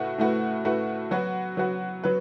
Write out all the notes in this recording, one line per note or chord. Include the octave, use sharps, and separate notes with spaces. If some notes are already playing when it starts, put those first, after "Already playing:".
Already playing: A2 A3 F#4 B4
A2 A3 F#4 B4
A2 A3 F#4 B4
F#3 B3 F#4 B4
F#3 B3 F#4 B4
F#3 B3 F#4 B4